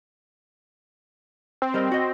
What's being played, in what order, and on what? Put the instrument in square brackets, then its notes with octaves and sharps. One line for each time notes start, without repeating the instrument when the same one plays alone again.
[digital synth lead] C4
[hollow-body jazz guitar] G3 A#4 D#5
F#4 D#5